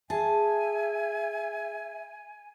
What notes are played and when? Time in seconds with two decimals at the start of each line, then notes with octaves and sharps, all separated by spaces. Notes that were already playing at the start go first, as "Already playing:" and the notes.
0.10 G#4 E5 G#5 A5